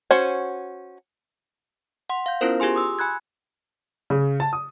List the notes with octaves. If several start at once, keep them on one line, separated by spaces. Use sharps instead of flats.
C#4 F#4 C5 G#5
F#5 C6
F5 G6
B3 C#4 E4 F4 A#4 C5
F4 G4 G#4 G#5 C6
C6 D#6 E6
G#5 B5 F#6 G#6
C#3
A5
D#6